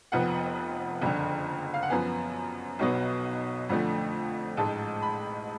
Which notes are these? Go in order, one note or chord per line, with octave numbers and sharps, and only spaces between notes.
F1 F2 F3 B3 F#5
F#1 F2 D3
F5
F#5
F#2 F3 B3 G#5
B1 B2 F#3 B3
F2 D3 F3 A3
A1 G#2 G#3 A5
B5